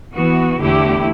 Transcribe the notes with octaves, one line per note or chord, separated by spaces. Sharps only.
E3 B3 F#4
E2 D3 A3 E4 G4